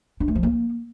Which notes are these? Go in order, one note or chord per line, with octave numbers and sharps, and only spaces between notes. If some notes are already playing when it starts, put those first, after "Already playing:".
D4
A3
F3
A#3